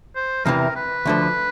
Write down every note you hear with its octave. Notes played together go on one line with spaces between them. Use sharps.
C5
E2 C3 E3 A#4
B4
D2 D3 F3